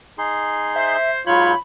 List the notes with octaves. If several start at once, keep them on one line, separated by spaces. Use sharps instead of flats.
D#4 G#4 C6
C5 E5
G#2 F#3 F4 C#5 B5 G6